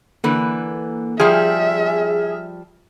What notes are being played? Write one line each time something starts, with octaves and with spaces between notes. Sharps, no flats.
D3 E3 A#3 B4
F3 G3 G#4 E5 F6